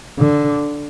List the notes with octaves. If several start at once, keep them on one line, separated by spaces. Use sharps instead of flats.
D3